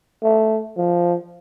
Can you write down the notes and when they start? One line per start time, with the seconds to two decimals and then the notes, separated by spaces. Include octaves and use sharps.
0.23 A3
0.77 F3